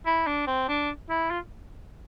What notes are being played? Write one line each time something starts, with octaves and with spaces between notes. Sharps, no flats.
E4
D4
C4
D4
E4
F4